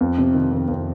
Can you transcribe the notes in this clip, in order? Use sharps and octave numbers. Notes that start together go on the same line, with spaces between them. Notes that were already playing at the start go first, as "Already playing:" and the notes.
F2
C3
D#3
F2
F2